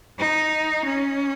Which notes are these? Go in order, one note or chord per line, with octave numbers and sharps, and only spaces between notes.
D#4
C#4